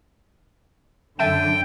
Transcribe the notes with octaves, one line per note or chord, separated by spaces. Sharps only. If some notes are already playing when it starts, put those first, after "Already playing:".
F#2 D3 E5 G5 A5 D#7